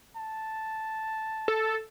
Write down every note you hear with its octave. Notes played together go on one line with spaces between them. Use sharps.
A5
A4